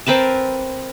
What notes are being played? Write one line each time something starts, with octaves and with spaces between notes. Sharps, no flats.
C4 A#4 B4 A5